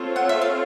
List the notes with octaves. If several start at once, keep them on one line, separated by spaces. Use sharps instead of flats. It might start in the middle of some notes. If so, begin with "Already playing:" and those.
Already playing: C4 F4 A4 C#5
F#5
E5
F5